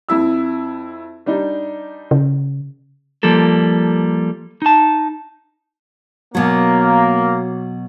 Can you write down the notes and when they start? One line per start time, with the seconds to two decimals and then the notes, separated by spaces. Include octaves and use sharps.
0.09 F2 E4 E6
1.26 G3 D4 D#4
2.11 C#3
3.23 F3 G3 A#3 A4
4.62 D#4 A5
6.35 B2 F#3 A#3